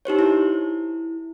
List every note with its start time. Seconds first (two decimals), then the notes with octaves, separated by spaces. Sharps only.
0.05 D#4 G4 C5 C#5
0.19 E4